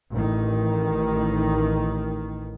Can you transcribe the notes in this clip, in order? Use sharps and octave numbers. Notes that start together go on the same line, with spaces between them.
A1 D#3